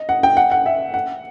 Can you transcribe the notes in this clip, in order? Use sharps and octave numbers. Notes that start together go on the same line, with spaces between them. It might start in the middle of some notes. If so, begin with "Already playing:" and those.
Already playing: D#5
F#5
G5
F#5
F#5
E5
F#5